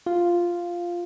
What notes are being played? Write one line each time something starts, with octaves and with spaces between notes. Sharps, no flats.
F4